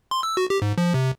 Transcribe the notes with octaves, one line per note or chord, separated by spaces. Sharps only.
C6
E6
F#4
G4
G#2
F3
C3